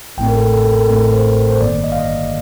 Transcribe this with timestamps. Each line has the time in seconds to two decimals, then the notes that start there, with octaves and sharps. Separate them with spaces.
0.18 A1 A2 A3 C4 G5
0.28 A#4
0.36 A4
0.53 A4
0.71 A#4
0.81 A4
0.89 A1 A2 A3 C4 A#4
1.13 C5
1.50 C5
1.61 G1 G2 D#3 A#3 D5
1.84 D#5
1.92 F5
2.00 D#5